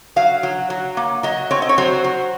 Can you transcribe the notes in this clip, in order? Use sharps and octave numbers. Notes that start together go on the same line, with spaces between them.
F#3 F5
F#3
F#3
A#3
F#3 D#5
C4 C#5
D#5
C#5
F#3 C5
F#3